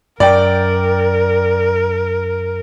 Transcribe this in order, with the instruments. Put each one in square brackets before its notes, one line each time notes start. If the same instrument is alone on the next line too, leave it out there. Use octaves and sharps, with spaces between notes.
[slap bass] F#2 [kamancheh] A#4 [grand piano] D5 G5